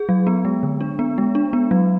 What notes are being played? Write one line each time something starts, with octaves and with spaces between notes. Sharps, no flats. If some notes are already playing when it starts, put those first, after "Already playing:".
Already playing: G#4
F#3
B3
G#3
D3
D4
B3
G#3
D4
B3
F#3